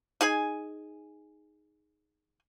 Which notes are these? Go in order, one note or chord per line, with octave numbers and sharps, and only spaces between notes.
D#4 G#4 G#5